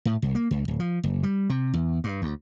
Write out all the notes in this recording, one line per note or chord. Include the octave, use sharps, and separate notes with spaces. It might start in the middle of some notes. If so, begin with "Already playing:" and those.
A2
C2
A#3
C#2
D1
F3
F#1
G3
C3
E2
G2
D2